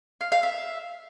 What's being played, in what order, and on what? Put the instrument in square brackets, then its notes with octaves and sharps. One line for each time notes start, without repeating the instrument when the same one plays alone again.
[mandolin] F5
F5
E5